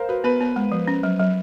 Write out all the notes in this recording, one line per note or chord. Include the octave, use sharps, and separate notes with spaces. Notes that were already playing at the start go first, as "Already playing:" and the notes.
Already playing: A#4 C5 F5
F#4 B4
B3 B4
B3
G#3
F3
C#4
F#3
F#3